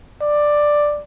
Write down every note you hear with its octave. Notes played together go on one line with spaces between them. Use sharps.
D5